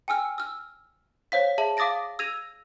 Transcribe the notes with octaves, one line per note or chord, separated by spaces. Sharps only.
G5 G#5 E6 F6
E6 F6
C5 C#5 F5 B6
G#4 E5 A5 F#7
F5 D6 D#6 A6 A#6 D7
E6 G#6 A#6 D#7 F7